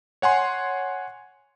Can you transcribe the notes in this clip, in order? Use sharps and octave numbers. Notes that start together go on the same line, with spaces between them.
C#5 F#5 G#5 C6